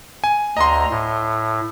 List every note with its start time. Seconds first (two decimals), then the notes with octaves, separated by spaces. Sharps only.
0.24 G#5
0.57 D2 D#5 A#5 C6
0.91 A2